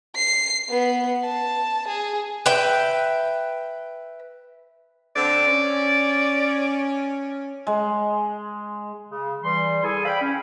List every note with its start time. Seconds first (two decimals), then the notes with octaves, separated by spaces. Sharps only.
0.16 C7
0.70 B3
1.25 A5
1.88 G#4
2.46 B4 E5 G5
5.16 D3 C4 D5
5.47 C#4
7.67 G#3
9.10 C#3
9.44 E3 G3 C6
9.84 E4 G#4 A4 G#5
10.05 C5 D5 F5 G5 B5
10.22 C#4